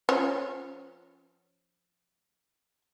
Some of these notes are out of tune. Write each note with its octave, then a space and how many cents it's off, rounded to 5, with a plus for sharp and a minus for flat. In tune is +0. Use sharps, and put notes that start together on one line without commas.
F3 +0 C#4 +5